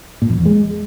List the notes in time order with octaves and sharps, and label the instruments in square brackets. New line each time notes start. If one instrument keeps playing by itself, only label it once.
[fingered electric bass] A#2
F2
E2
G#3